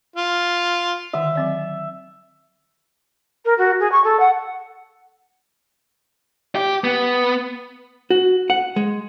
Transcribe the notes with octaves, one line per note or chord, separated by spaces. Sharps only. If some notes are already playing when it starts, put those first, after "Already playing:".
F4
D3 D#3 E5 F#5
F#3 C4 D5
A#4
F#4
G#4
C#6
A4
F#5
G4
B3
F#4
F#5
G#3